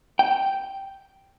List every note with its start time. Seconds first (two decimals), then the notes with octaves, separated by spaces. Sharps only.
0.19 G5